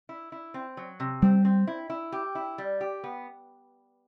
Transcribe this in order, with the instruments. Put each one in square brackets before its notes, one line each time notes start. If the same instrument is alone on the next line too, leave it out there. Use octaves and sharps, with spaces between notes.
[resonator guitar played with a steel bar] E4
E4
C4
F#3
C3
[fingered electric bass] G3 [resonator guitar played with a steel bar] C4
[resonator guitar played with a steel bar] C4
E4
E4
G4
E4
G3
G4
B3